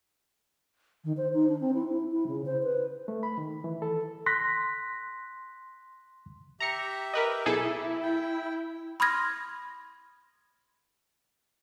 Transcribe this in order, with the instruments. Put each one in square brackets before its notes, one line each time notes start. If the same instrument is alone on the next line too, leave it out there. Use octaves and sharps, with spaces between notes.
[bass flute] D#3
C5
D#4
D4
C4
E4
E4
E4
C#3
C5
B4
[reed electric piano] A3
B5
D#3
E3
A4
[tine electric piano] C6 F#6 A#6 B6
[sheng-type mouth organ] G4 E5 [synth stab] A#5 C#7
[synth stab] A#4 B4 D#5
[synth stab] B1 G#4 A4 [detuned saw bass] E4
[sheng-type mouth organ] G5
[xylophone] B5 C6 D#6 F6 G#6 A#6